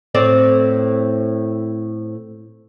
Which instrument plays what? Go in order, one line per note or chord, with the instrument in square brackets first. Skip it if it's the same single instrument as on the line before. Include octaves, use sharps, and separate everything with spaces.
[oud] A2 C4 D5